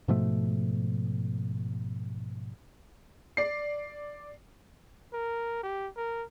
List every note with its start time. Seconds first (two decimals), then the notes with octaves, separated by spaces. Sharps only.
0.08 G#2 B2 F3 A3
3.37 D5 C7
5.13 A#4
5.63 G4
5.97 A#4